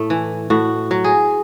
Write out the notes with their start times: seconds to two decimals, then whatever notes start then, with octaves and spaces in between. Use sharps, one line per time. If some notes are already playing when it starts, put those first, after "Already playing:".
Already playing: A2 A3
0.10 E3
0.50 A2 F#4
0.91 F#3
1.04 G#4